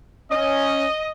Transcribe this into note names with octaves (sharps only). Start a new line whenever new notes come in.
C#4 D#5